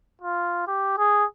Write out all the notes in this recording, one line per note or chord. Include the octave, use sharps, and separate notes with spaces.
F4
G4
G#4